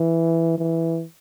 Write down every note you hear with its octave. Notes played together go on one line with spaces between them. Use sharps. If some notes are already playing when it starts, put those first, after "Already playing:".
Already playing: E3
E3